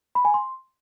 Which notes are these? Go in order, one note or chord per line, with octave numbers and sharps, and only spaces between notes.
B5
G#5
C6